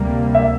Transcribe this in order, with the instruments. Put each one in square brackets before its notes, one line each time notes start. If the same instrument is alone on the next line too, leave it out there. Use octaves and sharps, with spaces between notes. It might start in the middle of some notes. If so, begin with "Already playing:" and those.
Already playing: [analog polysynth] D2 C3 G3 A#3
[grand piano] E5